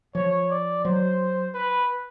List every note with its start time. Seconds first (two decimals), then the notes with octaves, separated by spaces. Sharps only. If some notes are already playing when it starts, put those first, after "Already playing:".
0.15 F3 C#5
0.50 D5
0.85 F#3 C5
1.55 B4